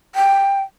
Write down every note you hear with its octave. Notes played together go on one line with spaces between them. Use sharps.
G5